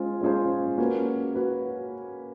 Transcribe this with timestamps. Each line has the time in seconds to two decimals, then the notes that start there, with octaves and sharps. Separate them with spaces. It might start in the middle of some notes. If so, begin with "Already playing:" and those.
Already playing: G#3 C#4 F4 G#4 C5
0.21 G#3 C#4 F4 G#4 C5
0.78 A#3 C#4 F#4 B4
1.35 F#4 B4